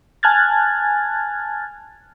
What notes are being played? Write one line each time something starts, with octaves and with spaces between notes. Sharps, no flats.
G#5 A5 F6 F#6 G#6 A6